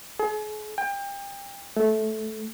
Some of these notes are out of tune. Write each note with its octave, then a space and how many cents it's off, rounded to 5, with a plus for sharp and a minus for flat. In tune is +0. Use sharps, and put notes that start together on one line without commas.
G#4 +40
G5 +30
A3 -15